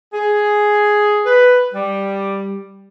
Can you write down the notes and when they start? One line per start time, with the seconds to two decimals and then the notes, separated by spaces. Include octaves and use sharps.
0.14 G#4
1.26 B4
1.74 G3